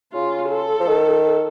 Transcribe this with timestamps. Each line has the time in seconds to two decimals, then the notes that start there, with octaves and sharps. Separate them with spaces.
0.13 C#3 F4
0.50 A4
0.80 F3
0.88 D#3